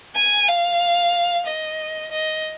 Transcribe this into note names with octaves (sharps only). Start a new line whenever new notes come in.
G#5
F5
D#5
D#5